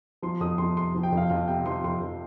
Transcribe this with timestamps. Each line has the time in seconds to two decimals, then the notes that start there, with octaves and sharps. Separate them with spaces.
0.22 F3 C6
0.41 F2 D#6
0.58 F2 C6
0.76 C3 C6
0.95 F3
1.03 G5
1.12 F2
1.17 F5
1.30 F2 F5
1.48 C3 G5
1.66 F3 C6
1.84 F2 C6
2.02 F2